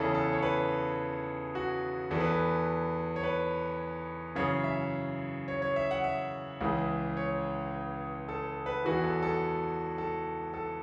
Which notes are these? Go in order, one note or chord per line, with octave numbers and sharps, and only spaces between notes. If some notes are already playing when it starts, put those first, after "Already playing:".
Already playing: E2 C#3 E3 A4
A4
C#5
B4
F#4
E2 E3 A4
B4
A4
C#5
B4
F#2 C#3 E3 C#5
E5
C#5
C#5
E5
F#5
E5
C#2 C#3 E3
C#5
A4
B4
E2 E3 F#4
A4
A4
A4
A4